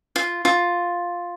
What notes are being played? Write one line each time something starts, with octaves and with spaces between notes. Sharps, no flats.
F4
F4